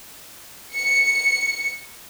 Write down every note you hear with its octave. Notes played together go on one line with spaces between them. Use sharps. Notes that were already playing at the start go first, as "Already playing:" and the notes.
C#7